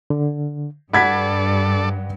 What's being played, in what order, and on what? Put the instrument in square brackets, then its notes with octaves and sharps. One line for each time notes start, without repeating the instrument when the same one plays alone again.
[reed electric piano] D3
[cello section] G2 [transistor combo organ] A4 D5 [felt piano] F#5 G#6 B6 [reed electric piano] B5